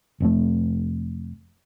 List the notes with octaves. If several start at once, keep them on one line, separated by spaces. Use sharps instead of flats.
F1 F2 A3